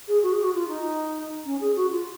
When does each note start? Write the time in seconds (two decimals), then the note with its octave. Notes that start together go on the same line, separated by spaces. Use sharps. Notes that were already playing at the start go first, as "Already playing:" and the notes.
0.08 G#4
0.23 F#4
0.33 G#4
0.43 F#4
0.54 F4
0.69 D#4
1.45 C#4
1.61 G#4
1.76 F#4
1.91 F4